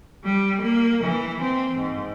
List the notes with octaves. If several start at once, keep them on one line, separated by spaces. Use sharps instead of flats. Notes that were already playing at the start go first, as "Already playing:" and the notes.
G3
A#3
E3
C4
G#2